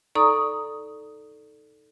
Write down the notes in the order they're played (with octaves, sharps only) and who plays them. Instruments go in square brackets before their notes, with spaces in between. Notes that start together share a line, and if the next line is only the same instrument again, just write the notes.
[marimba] D#4 A4 D5 A#5 C#6 D#6